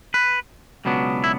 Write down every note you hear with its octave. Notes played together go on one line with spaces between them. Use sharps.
B4
C#2 B2 F#3 B3 D4
E4